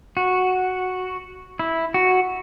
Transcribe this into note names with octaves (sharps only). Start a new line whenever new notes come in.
F#4
E4
F#4